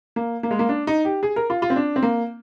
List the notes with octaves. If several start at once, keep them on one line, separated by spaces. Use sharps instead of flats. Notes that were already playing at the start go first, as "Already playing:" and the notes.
A#3
A#3
G#3
A#3
D4
D#4
G4
G#4
A#4
F4
F4
C4
D4
C4
A#3